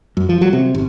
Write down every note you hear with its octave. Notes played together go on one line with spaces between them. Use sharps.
F#2
F3
F#3
C3
G#1